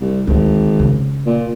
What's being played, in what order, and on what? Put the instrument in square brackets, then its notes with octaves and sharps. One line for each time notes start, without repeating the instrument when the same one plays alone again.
[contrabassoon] C2
[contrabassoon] G#1 [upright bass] D2 A3
[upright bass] C#3
[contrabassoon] A#2